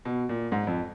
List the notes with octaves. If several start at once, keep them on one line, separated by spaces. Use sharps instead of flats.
B2
A#2
G#2
F2